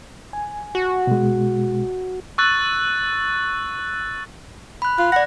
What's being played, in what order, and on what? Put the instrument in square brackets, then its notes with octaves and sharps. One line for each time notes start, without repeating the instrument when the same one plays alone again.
[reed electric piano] G#5
[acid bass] F#4
[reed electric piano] B2 G#3
[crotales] C#6 E6 F#6 A6
[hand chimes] B5 F#6
[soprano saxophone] F4 [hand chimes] F#6
[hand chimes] D5 A#6 [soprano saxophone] F#5